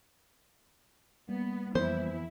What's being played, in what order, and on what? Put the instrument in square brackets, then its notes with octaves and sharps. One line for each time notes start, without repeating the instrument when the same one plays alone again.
[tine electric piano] G3 A#3 [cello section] B3
[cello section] F2 E4 [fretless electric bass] E3 B3 [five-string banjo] C5